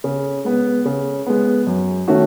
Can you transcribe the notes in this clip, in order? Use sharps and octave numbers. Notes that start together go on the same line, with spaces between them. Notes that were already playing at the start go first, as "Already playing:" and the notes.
C#3
G#3 B3
C#3
G#3 B3
F#2
D#3 A3 C#4 F#4